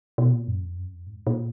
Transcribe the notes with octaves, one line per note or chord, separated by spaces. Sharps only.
B2
A#2
F#2
F2
F#2
F2
G#2
A#2